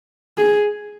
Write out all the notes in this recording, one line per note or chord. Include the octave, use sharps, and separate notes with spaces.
G#4